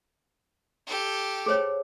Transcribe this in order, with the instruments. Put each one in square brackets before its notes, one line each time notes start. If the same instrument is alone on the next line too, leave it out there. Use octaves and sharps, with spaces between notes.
[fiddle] G4 A4
[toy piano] G#4 C5 C#5